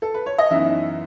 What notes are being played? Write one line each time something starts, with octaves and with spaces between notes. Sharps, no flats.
A4
B4
C#5
D#5
F#2 E3 B3 D#4 E5